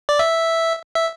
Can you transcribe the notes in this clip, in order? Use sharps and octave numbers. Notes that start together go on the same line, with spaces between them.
D5
E5
E5